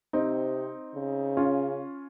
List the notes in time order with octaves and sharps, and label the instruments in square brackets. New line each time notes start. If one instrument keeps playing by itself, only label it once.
[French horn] C3 [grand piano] C4 D#4
[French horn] C#3
[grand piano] C#4 F4